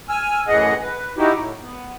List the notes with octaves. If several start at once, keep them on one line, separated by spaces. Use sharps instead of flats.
G#5 E6 F6
F#2 A2 E3 G#4 D#5 F#5
B4
D#4 E4 F#4 G4
A2
B3